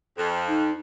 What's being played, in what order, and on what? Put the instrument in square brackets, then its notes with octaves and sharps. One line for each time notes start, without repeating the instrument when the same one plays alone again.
[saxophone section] F2
[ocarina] D#4